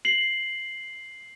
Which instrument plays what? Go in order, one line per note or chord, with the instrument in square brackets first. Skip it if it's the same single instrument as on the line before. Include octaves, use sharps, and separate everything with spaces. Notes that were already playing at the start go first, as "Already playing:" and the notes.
[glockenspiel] C7 F#7